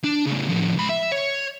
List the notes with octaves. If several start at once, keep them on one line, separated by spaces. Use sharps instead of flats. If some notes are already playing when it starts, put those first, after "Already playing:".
D4
A2 C#3
A2 F3
C#2 B5
E5
C#5